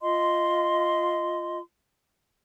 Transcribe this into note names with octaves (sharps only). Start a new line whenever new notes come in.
F4 D#5 C6